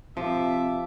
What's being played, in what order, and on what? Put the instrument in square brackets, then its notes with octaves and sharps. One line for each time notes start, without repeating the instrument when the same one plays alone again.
[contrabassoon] C3 [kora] F3 [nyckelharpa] E5 D6